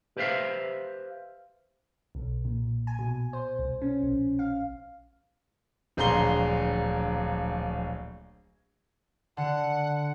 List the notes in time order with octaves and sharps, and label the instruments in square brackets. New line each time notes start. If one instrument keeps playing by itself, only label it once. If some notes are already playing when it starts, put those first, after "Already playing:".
[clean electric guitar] G4 B4 C5 E5 F5
[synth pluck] B1
A#2
G#5
B2
C5
C2
C#4
A#1
F5
[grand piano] D1 A#1 G#4 A#5 C6 G7
[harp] D3 [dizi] F#5